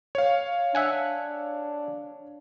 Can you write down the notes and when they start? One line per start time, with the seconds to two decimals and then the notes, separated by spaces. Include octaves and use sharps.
0.15 C#5 F5
0.75 D4 E5 F#5 G#5